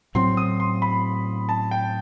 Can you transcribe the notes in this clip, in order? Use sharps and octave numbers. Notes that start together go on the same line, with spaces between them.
A2 F#3 C4 C6
D#6
C6
B5
A5
G5